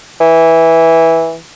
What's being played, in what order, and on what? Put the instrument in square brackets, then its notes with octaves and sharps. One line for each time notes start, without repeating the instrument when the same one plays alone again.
[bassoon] E3